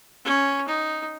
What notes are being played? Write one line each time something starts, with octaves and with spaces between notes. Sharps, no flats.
C#4
D#4